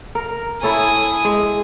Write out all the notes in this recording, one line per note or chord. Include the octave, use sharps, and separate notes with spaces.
A#4
E4 A4 C#5 G#5 D#6
G#3 G#4